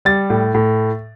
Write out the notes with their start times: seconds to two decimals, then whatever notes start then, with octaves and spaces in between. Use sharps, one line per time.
0.05 G3 A6
0.30 A2
0.54 A2